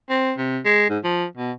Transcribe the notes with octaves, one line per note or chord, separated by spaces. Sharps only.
C4
C3
G#3
G#2
F3
B2